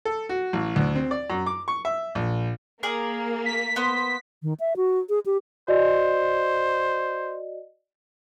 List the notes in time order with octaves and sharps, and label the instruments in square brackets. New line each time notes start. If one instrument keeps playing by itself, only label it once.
[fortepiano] A4
F#4
A1
D2
C4
D5
F#2
D6
C#6
E5
A#1
[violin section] A#3 [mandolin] G#4 A#4 D5
[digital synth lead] B6
[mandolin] B3 C5
[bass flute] D#3
E5
F#4
G#4
G4
[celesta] F#4 D5 D#5 [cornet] C5